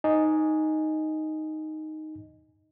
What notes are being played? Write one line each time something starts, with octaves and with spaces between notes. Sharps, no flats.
D#4 D#5 G#5